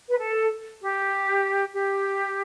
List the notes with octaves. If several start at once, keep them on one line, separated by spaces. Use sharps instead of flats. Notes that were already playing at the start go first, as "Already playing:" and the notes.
B4
A4
G4
G4